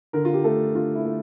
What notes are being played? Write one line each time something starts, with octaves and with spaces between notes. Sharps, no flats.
D3 A#4
F4
G4
A3 A4
D3 F4
E4
A3